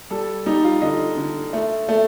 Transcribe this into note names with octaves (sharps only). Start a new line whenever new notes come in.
G3 A4
G3 D#4
F4
D3 D#5
D3
A3
A3